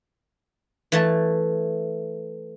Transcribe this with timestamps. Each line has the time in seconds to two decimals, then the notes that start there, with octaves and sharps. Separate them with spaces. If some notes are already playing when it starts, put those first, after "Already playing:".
0.92 E3 A3 A5